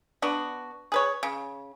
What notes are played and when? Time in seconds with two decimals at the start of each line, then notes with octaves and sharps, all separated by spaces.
0.22 B3 D4 F#4
0.92 G#4 B4 C#5
1.23 C#3